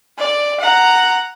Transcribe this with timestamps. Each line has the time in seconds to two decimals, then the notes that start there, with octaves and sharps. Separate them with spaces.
0.18 D5
0.60 F#5 A#5